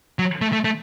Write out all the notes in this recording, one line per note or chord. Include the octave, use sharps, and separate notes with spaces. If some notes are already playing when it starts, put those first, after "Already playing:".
F#3
A3
A3
A3